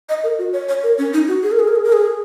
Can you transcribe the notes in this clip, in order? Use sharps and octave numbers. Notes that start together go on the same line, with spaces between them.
D#5
A#4
F#4
C#5
C#5
A#4
C#4
D#4
F#4
G#4
A#4
G#4
A#4
G#4
A#4
G#4